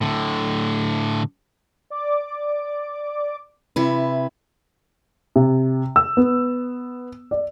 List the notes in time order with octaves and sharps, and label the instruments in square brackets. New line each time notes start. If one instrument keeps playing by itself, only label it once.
[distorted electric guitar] A2 D3
[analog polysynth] D5 D6
[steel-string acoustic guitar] C3 E4 B4
[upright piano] C3
E6
B3
D5